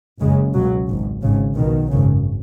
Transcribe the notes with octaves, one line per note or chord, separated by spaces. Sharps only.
F#1 F#2 C#3 G#3
C#2 B2 F#3
G#1 G#2
G#1 G#2 C#3
B1 B2 D#3
G#1 F#2 C#3